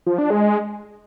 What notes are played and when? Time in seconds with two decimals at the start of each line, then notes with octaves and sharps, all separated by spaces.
0.06 F3
0.18 D4
0.30 G#3